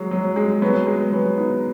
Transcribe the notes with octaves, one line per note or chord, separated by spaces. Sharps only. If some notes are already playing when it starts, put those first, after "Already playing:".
Already playing: F#3 G#3
F#3
G#3
F#3 B3
G#3
F#3 B3
B3 D#4